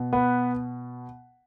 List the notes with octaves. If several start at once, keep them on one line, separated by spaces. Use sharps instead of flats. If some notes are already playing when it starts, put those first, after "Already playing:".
Already playing: B2
B3 B4